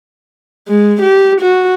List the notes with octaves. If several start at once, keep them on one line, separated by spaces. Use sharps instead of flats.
G#3
G4
F#4